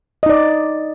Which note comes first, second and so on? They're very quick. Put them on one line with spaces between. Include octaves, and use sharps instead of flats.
D#5 D#4 D5